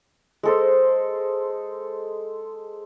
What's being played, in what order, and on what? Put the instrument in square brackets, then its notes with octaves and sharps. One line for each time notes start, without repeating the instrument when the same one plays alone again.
[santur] G#3 A4 C5